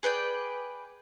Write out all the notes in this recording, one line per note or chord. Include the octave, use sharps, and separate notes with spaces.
G#4 B4 D5 G5